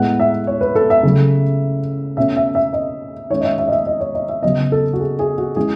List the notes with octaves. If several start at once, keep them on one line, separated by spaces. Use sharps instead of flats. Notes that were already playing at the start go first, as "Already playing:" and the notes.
Already playing: A2 G#3 B3 F#5
E5
C#5
B4
A4
E5
C#3 F#3 A3
B2 A3 C#4 E5
E5
E5
D#5
D#3 G#3 C#4 C#5
D#5
E5
E5
D#5
E5
D#5
C#5
D#5
E5
C#3 F#3 B3 D#5
A4
F#4
G#4
G#4
F#4
E3 G#3 C#4 G#4